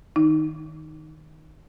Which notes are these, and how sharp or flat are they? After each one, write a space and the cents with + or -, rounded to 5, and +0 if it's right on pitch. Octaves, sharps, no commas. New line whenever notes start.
D#3 +0 D#4 +0